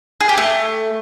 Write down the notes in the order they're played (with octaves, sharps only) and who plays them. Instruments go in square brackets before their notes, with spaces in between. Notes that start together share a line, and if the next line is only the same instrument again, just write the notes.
[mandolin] G#4
G4
A3